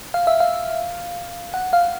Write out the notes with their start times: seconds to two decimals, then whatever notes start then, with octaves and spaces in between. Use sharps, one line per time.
0.14 F5
0.27 E5
0.40 F5
1.54 F#5
1.73 F5